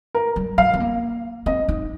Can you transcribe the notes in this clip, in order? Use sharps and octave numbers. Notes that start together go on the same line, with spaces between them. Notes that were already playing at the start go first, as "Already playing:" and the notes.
A#4
G3
G3 F5
C4
A#3
C4 D#5
D#4